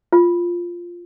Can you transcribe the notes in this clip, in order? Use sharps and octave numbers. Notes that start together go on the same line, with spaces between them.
F4